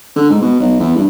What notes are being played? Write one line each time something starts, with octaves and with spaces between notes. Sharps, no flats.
D3
G#2
B2
B1
E2
G2